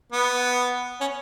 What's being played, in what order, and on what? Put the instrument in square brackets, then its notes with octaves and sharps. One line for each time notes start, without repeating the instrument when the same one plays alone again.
[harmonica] B3
C#4